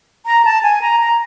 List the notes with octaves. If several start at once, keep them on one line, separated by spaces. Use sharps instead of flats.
A#5
A5
G#5
A#5
A#5